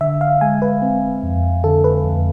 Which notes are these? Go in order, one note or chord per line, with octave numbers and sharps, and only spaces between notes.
D3 E5
F5
G#3 G#5
B4
C4
F2
D3 A4
B4
F2